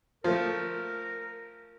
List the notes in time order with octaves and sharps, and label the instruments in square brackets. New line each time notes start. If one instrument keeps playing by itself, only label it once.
[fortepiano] F3 A3 [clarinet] A#4